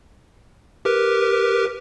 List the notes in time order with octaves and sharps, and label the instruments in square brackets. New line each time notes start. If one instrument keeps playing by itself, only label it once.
[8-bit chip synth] G4 A#4 B4